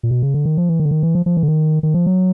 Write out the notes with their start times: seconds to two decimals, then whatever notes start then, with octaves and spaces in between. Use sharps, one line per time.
0.03 A#2
0.11 B2
0.23 C#3
0.34 D3
0.45 D#3
0.58 F3
0.69 E3
0.80 D#3
0.85 D3
0.91 D#3
1.03 E3
1.15 F3
1.26 F3
1.37 E3
1.43 D3
1.48 D#3
1.83 D#3
1.94 F3
2.06 F#3